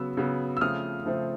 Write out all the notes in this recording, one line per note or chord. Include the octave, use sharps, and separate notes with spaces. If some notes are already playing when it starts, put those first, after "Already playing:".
Already playing: C#3 F#3 B3 E6
C#3 F#3 B3
E6
C#3 F3 A3 C4 D#6 F6
C#3 F3 A3 C4